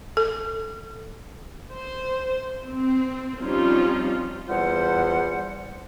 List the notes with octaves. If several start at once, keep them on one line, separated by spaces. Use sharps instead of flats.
A4
C5
C4
F3 G3 C4 C#4 D#4 F4
E2 F3 G3 C5 F#5